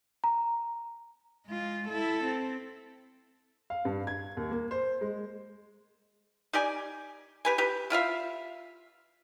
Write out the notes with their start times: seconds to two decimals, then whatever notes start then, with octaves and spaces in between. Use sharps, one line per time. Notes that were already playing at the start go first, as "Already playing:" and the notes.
0.24 A#5
1.47 G#3 F4
1.88 E4 A4
2.25 C4
3.70 F5
3.85 G2
4.07 G#6
4.37 D#2
4.51 A#3
4.71 C5
5.01 G#3
6.53 D#4 G4 D5 G#5
7.45 G4 B4 G#5
7.58 G4 B4
7.90 E4 F4 E5 F5